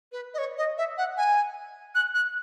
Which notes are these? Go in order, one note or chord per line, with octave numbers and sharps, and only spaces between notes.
B4
D#5
C#5
D#5
E5
F#5
G#5
F#6
F#6